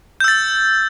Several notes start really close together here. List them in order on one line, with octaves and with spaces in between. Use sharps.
G6 E6 A6